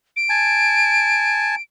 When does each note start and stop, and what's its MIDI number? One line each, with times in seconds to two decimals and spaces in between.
0.16 1.62 98
0.29 1.55 80
0.29 1.55 81